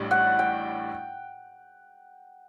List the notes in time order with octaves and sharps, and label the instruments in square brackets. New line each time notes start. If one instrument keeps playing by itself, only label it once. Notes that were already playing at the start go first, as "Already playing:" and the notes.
Already playing: [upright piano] A1 A2 G3 D4
[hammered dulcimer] F#5
G5